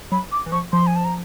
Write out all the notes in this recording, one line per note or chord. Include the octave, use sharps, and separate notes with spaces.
F#3 B5
D6
E3
F3 C#6
F3 C6
G#5
A5
A#5